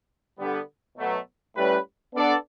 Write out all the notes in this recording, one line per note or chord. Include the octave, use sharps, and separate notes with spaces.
D3 G3 B3
B2 F#3 A3
A2 G3 C#4 G4 B4
B3 D4 A4 D5